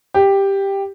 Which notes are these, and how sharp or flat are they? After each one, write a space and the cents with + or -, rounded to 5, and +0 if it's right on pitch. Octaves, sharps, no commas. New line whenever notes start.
G4 +5